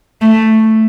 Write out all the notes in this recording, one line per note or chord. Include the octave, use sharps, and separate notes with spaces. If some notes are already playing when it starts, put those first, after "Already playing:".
A3